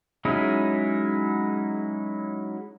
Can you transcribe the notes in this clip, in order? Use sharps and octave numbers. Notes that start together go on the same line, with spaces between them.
F#3 G#3 C#4 D#4 E4